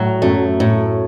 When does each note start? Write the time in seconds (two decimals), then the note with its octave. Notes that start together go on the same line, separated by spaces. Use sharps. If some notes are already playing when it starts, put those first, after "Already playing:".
Already playing: A2 F#3
0.22 F#2 A3
0.60 A2